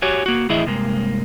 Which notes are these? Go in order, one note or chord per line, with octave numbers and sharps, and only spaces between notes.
F#4 G4 C#5 G#5
A#3 F#4
A2 E3 E4 G#4 D#5 E5
G2 C3 G#3 A#3